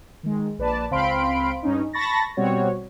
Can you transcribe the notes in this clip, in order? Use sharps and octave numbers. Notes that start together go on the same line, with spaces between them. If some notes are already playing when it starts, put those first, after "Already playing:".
D#3 G#3
A#1 B4 D5 A5
C#2 C4 F5 B5 C6 D7
G2 C#4 D#4
A5 B5 C#6 A6 A#6
B2 G3 C4 F#4 C#5